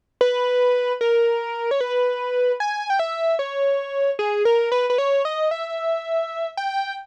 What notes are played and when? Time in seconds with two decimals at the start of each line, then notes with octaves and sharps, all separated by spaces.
0.21 B4
1.01 A#4
1.71 C#5
1.81 B4
2.60 G#5
2.90 G5
2.99 E5
3.39 C#5
4.19 G#4
4.45 A#4
4.72 B4
4.90 B4
4.98 C#5
5.25 D#5
5.51 E5
6.57 G5